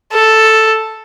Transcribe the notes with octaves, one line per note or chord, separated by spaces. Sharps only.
A4